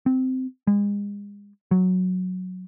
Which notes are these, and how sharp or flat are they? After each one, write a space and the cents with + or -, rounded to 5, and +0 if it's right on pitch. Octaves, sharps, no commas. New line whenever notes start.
C4 -15
G#3 -35
F#3 -10